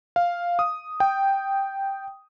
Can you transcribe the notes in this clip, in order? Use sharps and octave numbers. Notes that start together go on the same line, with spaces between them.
F5
D#6
G5